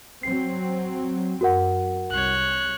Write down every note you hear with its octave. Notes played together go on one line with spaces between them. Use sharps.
F#3 C4 C7
F#2 F#4 A#4 F#5
C2 C#5 F#6